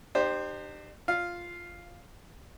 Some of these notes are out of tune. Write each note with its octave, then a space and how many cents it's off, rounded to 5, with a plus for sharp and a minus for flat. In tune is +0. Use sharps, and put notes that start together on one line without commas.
D4 +45 G4 +0 C5 +0
F4 +0 F5 +0